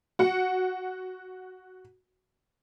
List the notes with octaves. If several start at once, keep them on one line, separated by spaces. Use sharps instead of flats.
F#4 F#5